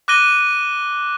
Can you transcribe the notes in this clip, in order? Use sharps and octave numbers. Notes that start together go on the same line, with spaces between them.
D6 F#6 A#6 D#7 G7